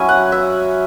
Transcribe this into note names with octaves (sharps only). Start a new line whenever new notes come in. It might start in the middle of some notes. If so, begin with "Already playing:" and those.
Already playing: F#3 C#4 E4 G#5
F#5
E5